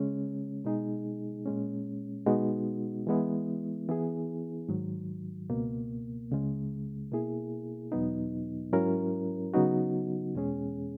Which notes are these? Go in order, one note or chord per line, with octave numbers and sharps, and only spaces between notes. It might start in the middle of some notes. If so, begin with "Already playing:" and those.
Already playing: C#3 G#3 C#4
B2 G#3 D#4 G#4
A#2 G#3 C#4
B2 G#3 B3 D#4 F#4
E3 G#3 B3 E4
E3 B3 E4 G#4
G#2 D#3 F#3
C#2 B2 A#3
C#2 C#3 G#3
B2 A#3 E4 G#4
E2 B2 F#3 B3 D#4
G#2 F#3 C#4 E4 A#4
C#3 F#3 B3 D#4 F#4
E2 B2 G#3 C#4 G#4